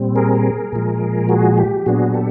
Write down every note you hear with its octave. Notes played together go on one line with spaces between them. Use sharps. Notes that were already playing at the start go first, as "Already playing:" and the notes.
Already playing: A#2 G3 C4
G#4 A#4
A#2 F3 G#3
F#4 G#4
G4
A#2 F#3 B3 D4 F#4 G#4
G4 A4